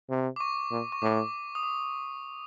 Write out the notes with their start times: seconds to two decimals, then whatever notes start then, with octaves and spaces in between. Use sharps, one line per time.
0.10 C3
0.36 D6
0.40 C#6
0.71 A#2
0.92 C#6
1.02 A2 D6
1.55 D#6
1.63 D6